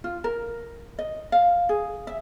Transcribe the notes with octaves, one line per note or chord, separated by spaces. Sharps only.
F4
A#4
D#5
F5
G#4
E5